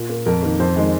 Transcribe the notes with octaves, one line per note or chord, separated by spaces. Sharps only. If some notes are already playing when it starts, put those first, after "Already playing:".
Already playing: A#2
A#3
F2 A#4
D#3 A#3
F2 C5
D#3 G#3